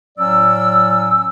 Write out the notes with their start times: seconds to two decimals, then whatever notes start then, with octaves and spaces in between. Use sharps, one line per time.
0.18 A2 F#3 C#4 D5 E6